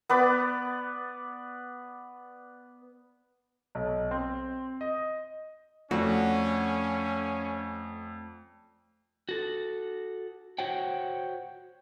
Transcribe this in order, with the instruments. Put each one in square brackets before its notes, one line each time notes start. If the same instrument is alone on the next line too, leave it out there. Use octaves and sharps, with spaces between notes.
[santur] B3 B4 D5
[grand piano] B1
C4
D#5
[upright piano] F2 [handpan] A3 D5 F#5 [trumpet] C#4 [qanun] F#4
[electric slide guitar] F#4 A4
F#4 C5 C#5 F#5 G5